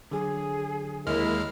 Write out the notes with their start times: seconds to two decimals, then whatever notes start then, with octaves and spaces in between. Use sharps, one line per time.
0.11 D3 F#3 G#4
1.07 D#2 G#3 E4 A#4 F6